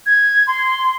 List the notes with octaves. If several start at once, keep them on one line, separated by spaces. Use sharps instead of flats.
G#6
C6